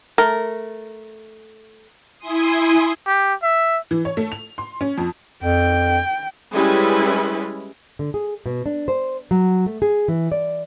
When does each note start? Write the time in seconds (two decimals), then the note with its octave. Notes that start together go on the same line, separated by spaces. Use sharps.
0.18 A3 A#4
2.18 E4 G#5 C6 D#6
3.07 G4
3.43 E5
3.91 E3
4.05 C#5
4.17 A3
4.32 F7
4.58 C6
4.81 C#4
4.98 F2
5.44 F2 G5
6.53 G3 G#3 C#4 E4 B4
7.99 D3
8.14 G#4
8.46 B2
8.66 D4
8.88 C5
9.31 F#3
9.66 A3
9.82 G#4
10.08 E3
10.32 D5